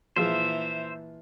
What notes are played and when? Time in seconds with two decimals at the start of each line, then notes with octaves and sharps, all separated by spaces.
0.16 A#2 E3 F3 G#3 F4 C5 E5